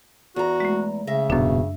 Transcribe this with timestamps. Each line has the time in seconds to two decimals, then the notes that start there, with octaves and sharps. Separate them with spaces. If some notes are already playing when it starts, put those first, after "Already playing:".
0.36 E2 F#4 A#5
0.60 G#3 A3
1.07 C#3 E5 A#6
1.30 D#1 F#2 B2 D4